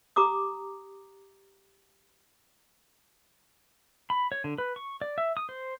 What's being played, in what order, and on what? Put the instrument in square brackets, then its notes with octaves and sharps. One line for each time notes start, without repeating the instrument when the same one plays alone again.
[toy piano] G4 A#5 D6 D#6
[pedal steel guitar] B5
C#5
D3
B4
C#6
D5
E5
D#6
C5